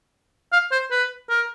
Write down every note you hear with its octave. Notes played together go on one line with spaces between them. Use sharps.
F5
C5
B4
A#4